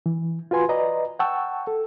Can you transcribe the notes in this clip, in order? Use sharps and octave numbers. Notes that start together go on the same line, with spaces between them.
E3
F4 F#4 B4 G#5 C6
B4 D5 D#5 A#5
F#5 G5 A5 C#6 E6
A4